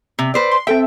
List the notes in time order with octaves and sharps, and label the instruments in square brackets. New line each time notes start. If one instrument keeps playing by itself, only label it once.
[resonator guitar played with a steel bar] C3
B4 C5 D5
[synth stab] C6
[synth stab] C4 A4 E5 [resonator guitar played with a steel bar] G5